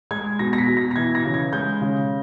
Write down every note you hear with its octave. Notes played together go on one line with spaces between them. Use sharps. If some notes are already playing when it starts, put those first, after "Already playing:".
G#3 G#6
B2 A#6
A#6
B6
B2
A#6
A#6
E3 G#6
A#6
C#3
G#6
G#3 G6
C#3